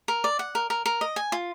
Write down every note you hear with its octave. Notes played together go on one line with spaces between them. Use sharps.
A#4
D5
F#5
A#4
A#4
A#4
D#5
G#5
F4